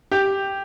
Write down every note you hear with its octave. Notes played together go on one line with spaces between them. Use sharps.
G4